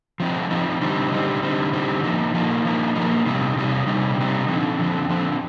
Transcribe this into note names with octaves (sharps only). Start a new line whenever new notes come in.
F3 C4 D#4
F3 C4 D#4
D3 G3 C4 D#4
D3 G3 C4 D#4
D3 G3 C4 D#4
D3 G3 C4 D#4
F3 A#3 D#4
F3 A#3 D#4
F3 A#3 D#4
F3 A#3 D#4
C3 G3 C4 D#4
C3 G3 C4 D#4
C3 G3 C4 D#4
C3 G3 C4 D#4
D3 F3 C4
D3 F3 C4
D3 F3 C4